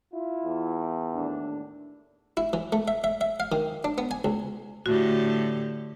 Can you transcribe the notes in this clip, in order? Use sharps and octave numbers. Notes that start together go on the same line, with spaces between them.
E4 F4
E2
D#2 A2 D4
E4
E3
A3
E5
E5
E5
F5
D#3
D4
B3
G#5
C#2
A2 D3 F#4 G4